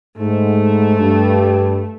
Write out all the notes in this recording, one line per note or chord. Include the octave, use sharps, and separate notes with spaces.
G#2 A3
G2